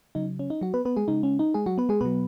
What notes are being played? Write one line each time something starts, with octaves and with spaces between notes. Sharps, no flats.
C#3 F#3 D#4
C#4
D#4
F#3 F#4
B3 B4
B3 B4
G#3 G#4
C#3 G#3 D#4
C#4
D#4
G#3 G#4
F#3 F#4
B3 B4
G#3 G#4
B2 F#3 B3 B4